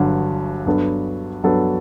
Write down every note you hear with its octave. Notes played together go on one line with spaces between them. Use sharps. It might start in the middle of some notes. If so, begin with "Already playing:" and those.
Already playing: G1 G2 D3 F#3
G2 F#3 B3 D4 A4
G2 F#3 B3 D4 A4